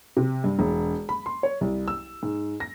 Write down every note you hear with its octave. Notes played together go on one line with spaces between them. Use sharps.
C3
G2
E1
B5
C6
C#5
C2
E6
G#2
A#6